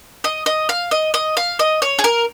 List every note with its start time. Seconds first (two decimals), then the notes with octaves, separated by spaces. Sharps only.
0.24 D#5
0.46 D#5
0.69 F5
0.91 D#5
1.14 D#5
1.37 F5
1.59 D#5
1.82 C#5
1.99 G#4
2.04 A#4